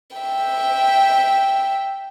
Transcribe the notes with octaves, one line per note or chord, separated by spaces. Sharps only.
E5 G5